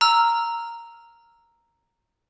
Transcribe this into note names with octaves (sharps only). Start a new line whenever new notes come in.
A#5 E6 F6